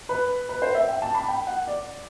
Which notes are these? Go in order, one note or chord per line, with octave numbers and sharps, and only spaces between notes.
B4
B4
C5
E5
G5
A5
B5
G5
F#5
D5